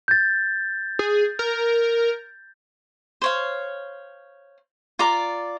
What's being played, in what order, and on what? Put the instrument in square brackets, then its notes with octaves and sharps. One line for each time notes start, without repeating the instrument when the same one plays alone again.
[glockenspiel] G6 A6
[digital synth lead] G#4
A#4
[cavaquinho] C5 C#5 F5
F4 D5 A#5 D6